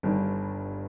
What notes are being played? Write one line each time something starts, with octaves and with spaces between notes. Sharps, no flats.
G1 G2 D#3